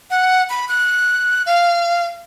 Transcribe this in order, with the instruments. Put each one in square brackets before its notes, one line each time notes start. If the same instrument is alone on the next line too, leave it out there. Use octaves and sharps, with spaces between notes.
[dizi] F#5
B5
F#6
F5